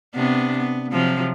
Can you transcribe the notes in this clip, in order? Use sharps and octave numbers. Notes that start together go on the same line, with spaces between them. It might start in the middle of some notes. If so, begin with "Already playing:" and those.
C3 B3 D4
B3
C3 F3 F#3